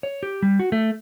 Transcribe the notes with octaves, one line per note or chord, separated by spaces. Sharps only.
C#5
G4
G3
F#4
A3